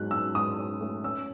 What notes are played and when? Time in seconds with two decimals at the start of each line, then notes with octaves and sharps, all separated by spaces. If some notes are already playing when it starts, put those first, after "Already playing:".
Already playing: G#2 F#3 F#6
0.11 C#4 E6
0.34 G#2 D#6
0.58 C#4
0.81 A3
1.04 C#4 E6